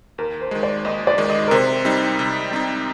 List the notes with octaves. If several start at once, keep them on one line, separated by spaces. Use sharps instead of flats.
D#2 A#4
C5
D#3 G#3
D5
D#2 D#5
D5
D#3 G#3
D#5
A#4
C3 C5
G3 C4 D#4
C3
G3 C4 D#4